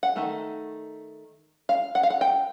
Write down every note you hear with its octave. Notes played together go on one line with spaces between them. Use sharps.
F#5
D#3 F#3 A3
F5
F#5
F5
F#5
G5